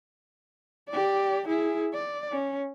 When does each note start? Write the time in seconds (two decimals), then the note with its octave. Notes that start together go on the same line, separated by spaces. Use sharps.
0.89 G4 D5
1.47 E4 G#4
1.94 D5
2.32 C#4